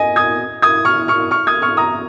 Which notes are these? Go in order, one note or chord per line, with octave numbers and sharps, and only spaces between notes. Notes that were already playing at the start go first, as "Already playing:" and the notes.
Already playing: D#5 G#5
D#6 G#6
D#6 G#6
C#6 F6
C#6 F6
C#6 F6
D#6 G#6
C#6 F6
A#5 D#6